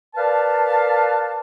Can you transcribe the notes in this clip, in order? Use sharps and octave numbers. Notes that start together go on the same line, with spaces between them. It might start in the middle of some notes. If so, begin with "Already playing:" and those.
A#4 B4 D5 F5 A5